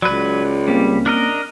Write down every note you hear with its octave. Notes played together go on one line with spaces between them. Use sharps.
C#2 F#3 B4 D5 B5
G3 A#3 C4 C#4
D4 A#4 D#5